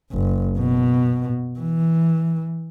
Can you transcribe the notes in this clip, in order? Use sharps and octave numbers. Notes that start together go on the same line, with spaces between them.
F#1
B2
E3